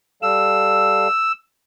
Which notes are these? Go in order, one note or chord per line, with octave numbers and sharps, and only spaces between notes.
G3 A4 F5 E6